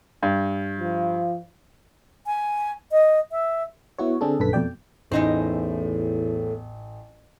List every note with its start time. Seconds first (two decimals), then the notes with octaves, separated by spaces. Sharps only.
0.23 G2
0.80 F3
2.26 G#5
2.92 D#5
3.31 E5
3.99 B3 E4 F#4 C#5
4.21 D3 C4 D4 G#4 A4
4.39 A#1 F#2 D3 A4 B4 B6
4.53 F2 B2 A3 D5 G5
5.12 A1 E2 A2 E3 D#4 C5